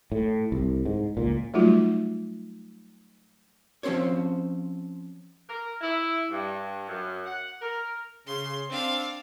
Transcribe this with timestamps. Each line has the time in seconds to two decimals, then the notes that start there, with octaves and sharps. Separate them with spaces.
0.12 A2
0.52 C2
0.85 G#2
1.17 C#2 A#2
1.54 F#3 G3 A3 D#4 F4 F#4
3.83 F3 C4 C#4 C5 C#5
5.47 A#4
5.81 E4
6.30 G2
6.87 F#2
7.25 F#5
7.61 A#4
8.27 C#3 C6
8.70 C4 D4 F5